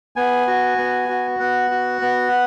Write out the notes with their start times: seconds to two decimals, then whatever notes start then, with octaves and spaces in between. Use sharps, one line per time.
0.16 B3 G#5
0.47 F#4
0.78 B3
1.09 F#4
1.40 B3 F#5
1.71 F#4
2.02 B3